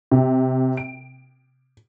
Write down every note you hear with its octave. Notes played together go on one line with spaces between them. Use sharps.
C3
D7